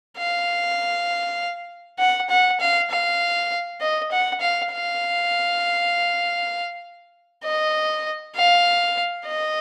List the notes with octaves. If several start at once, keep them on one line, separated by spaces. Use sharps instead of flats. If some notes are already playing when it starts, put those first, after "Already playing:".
F5
F#5
F#5
F5
F5
D#5
F#5
F5
F5
D#5
F5
D#5